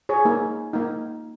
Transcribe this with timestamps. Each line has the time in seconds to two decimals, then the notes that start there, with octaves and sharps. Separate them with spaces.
0.09 G#4 C#5
0.25 A#3 D#4
0.73 A#3 D#4